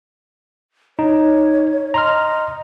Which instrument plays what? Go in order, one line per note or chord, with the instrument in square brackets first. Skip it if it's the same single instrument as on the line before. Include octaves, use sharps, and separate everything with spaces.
[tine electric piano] D#4 [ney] C#5
[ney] D#5 [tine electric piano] A#5 C6 F6